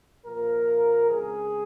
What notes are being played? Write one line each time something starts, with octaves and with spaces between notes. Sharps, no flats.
A#2 F3 A#3 A#4
C#3 G#3 C4 G#4